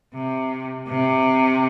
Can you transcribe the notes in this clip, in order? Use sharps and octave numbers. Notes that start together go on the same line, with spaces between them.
C3
C3